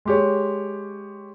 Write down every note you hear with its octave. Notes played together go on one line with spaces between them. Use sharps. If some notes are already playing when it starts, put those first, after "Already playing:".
G#3 G4 C#5